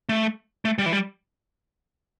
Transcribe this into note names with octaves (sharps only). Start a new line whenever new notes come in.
A3
A3
G3
E3
G3